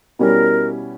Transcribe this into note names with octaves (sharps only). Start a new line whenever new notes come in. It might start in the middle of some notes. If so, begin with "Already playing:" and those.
B2 G3 C#4 E4 A#4